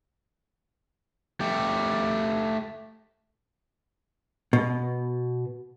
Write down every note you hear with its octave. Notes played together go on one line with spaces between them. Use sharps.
A3 G4
B2